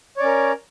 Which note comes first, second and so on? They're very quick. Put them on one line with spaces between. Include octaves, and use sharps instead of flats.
C#5 D5 C#4 A#4